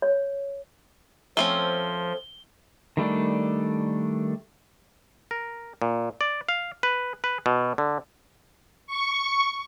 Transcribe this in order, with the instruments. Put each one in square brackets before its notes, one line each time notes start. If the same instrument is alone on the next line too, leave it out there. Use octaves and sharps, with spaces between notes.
[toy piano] C#5
[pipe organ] F3 [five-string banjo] A3 C4 C#4 [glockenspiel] G7
[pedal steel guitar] D#3 G3 A3 D4
[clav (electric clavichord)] A#4
A#2
D5
F5
B4
B4
B2
D3
[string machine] C#6